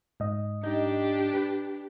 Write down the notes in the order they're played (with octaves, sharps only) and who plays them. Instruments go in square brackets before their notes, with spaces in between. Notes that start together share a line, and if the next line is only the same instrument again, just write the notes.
[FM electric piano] G#2 D#5
[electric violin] D4 G4 [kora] D#4
[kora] B4